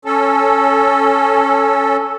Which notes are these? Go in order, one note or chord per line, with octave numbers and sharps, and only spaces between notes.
C#4 A4